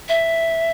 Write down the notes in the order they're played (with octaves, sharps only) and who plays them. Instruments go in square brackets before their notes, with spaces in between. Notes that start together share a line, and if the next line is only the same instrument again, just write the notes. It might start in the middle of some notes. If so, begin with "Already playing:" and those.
[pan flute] E5